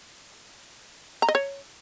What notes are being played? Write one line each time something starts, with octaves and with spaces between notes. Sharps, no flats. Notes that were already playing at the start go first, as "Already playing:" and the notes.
A#5
D#5
C#5